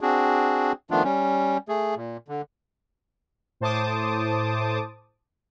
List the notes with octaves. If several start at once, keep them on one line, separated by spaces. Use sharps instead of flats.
C4 D4 F#4 G#4
D#3 F3 A3 B3 D4 F4
G3 C#4
A3 G#4
A#2
D3
A2 C5 A5 D6 D#6